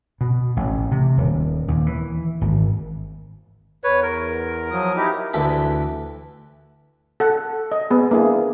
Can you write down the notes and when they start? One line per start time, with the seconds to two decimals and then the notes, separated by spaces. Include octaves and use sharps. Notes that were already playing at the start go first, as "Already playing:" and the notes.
0.21 B2
0.57 A1
0.91 C3
1.18 D#1
1.68 D#2
1.86 E3
2.41 G#1
3.84 E2 B4 C#5
4.02 A#4
4.71 F3 F#3 D#6
4.96 D#4 E4 G4
5.34 D2 E3 A4 B5
7.20 A4 F#5
7.72 D#5
7.91 B3 G#4
8.11 A#3 D4 E4 G#4